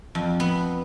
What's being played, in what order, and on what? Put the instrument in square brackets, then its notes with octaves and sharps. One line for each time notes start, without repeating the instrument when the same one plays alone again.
[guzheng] F2
B3